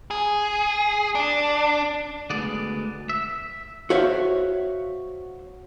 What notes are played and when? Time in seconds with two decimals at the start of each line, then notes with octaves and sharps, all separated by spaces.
0.11 G#4
1.15 D4
2.30 D2 G#3 B3 D5
3.09 E5
3.90 F#4 C5 C#5 E5 F5